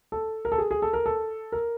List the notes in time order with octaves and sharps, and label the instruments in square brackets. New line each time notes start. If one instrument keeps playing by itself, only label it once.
[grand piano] A4
A#4
A4
G#4
G#4
A4
A#4
A4
A#4